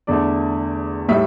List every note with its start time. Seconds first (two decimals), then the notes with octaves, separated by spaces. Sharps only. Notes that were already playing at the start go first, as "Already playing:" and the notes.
0.07 E2 D3 A3 D5
1.08 A2 G3 E5